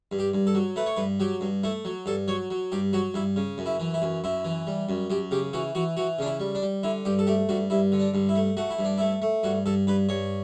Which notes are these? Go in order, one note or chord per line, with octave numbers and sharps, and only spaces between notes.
G2
G4
G2
A4
F#3
A3 B4
C#5
G2 B4
F#3 G4
G2
A3 E4
F#3
G2 A4
F#3 C#5
F#3
G2 G4
F#3 F#4
G2 E4
C#3
F#2
E4
E3
E4
F#2
F#2 E4
E3
G3
F#2
F#2 G4
C#3 G4
E3 F#4
E3 F#4
E3 F#4
C#3 D4
E4
G3
D4
G3
D3 E4
G2 G4
A4
A3 G4
G2 F#4
G2 E4
D3
D4
G2
E4
A3
A3 F#4
E4
G2
D4
A3 E4
A3
G2 F#4
G2 A4
G2 B4
G2 C#5